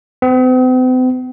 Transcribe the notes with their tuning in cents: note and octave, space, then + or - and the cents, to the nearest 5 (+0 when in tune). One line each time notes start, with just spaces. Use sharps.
C4 -45